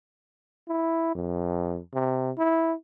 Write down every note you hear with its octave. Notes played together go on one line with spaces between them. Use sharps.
E4
F2
C3
E4